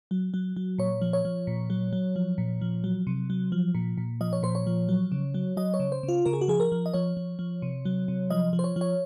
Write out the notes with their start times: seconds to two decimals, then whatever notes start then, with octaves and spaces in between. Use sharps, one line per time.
0.11 F#3
0.34 F#3
0.56 F#3
0.78 A#2 C#5
1.02 F3
1.13 C#5
1.25 F3
1.47 A#2
1.70 F#3
1.93 F#3
2.16 F3
2.38 A#2
2.61 F3
2.84 F#3
3.07 C3
3.30 F#3
3.52 F3
3.75 A#2
3.97 A#2
4.21 F3 D#5
4.33 C#5
4.43 A#2 C5
4.55 C#5
4.67 F3
4.89 F#3
5.12 C#3
5.34 F#3
5.57 F#3 D#5
5.74 C#5
5.80 C#3
5.92 C5
6.03 C#3
6.09 F4
6.26 C#3 A#4
6.33 G#4
6.41 F#4
6.48 F3 G#4
6.60 A#4
6.72 F3
6.86 D#5
6.94 F3 C#5
7.17 F3
7.39 F3
7.62 C3
7.85 F#3
8.08 C3
8.30 F3 D#5
8.53 F3
8.59 C5
8.64 C#5
8.76 F3
8.81 C#5